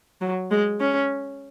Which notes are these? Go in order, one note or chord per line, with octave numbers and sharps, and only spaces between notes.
F#3
G#3
C#4